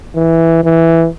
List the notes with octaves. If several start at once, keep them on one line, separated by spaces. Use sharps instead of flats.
E3
E3